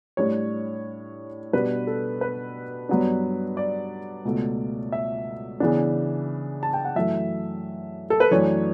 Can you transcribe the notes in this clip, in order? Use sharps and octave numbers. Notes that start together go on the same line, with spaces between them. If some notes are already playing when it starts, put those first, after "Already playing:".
A2 G3 D4 C#5
B2 G3 D4 B4
A4
B4
G2 F#3 B3 D4
D5
C#2 B2 A3
E5
C#3 E3 B3 D4
A5
G5
F#5
F#2 E3 A3 E5
A4
B4
F#2 E3 A3 D4 C#5